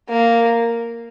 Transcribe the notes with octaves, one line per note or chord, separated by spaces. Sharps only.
A#3